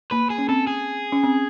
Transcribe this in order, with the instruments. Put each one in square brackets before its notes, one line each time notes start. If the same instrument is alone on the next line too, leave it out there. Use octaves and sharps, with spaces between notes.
[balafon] A#3 [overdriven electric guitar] B4
[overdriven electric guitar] G#4
[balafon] C#4
[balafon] C4 [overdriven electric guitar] A4
[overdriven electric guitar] G#4
[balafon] C#4
C4